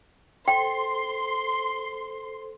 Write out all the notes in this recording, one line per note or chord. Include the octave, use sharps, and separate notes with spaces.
A4 C5 G5 C6